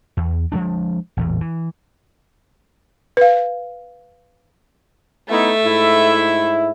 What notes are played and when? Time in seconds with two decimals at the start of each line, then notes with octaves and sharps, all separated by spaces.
0.17 E2
0.52 F3 G#3 D4
1.17 A1 E2 A#2
1.41 E3
3.17 B4 F5
5.29 A3 B3 D#4 E4 E5
5.64 G#2 E4